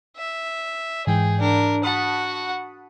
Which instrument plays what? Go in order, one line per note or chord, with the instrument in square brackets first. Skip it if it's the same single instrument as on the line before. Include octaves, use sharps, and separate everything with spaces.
[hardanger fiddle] E5
[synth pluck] G#2 E3 G5 [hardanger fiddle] G#4
[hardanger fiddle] D4 A#4
[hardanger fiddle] F#4 F#5 [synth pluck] A5 B5 D#6